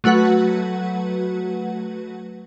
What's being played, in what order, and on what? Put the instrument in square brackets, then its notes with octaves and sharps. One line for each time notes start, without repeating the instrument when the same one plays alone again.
[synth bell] F#3 A3 F#4 B4 F#5